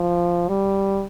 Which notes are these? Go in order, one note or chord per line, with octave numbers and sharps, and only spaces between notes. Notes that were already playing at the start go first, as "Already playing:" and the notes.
Already playing: F3
G3